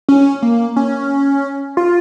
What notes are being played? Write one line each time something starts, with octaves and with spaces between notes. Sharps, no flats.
C#4
A#3
C#4
F4